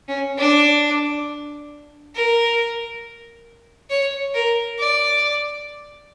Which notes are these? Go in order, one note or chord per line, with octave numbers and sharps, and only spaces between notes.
C#4
D4
A#4
C#5
A#4
D5